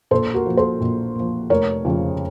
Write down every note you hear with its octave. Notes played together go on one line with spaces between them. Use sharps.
A#1 A4 C5
F#4 A#4
A#2 F3
A4 C5
A#1
A#2 F3
F1 A#4 C#5
F2 C#3 F3